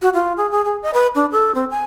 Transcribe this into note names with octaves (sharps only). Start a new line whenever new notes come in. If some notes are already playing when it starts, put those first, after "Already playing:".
F#4
F4
G#4
G#4
G#4
D#5
B4
D4
A4
C4
G#5